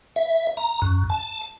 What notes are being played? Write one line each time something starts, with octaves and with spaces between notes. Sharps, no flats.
E5
A#5
F#2
A5